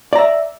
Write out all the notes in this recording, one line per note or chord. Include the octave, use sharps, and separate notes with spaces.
D5 E5 A#5